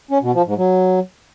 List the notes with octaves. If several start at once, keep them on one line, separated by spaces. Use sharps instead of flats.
C#4
B2
F3
G#2
F#3